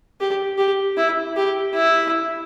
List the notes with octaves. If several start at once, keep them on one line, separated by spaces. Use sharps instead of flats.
G4
G4
E4
G4
E4